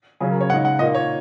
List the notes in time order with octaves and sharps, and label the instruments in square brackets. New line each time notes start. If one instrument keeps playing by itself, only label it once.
[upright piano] C#3 F#3 C#4 G#4
A#4
C#5
C#3 G#3 D#4 F#5
F#5
A#2 A#3 D#4 D#5
C#5